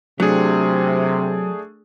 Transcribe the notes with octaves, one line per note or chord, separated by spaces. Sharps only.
C3 F#3 A3 D4 G#4